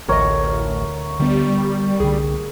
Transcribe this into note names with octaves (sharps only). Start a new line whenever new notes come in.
A1 D2 A#4 C#5 D#5
D3 G3 B3
C2 D3 G#4